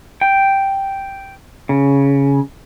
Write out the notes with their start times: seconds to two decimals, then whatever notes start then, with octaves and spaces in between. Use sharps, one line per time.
0.21 G5
1.69 C#3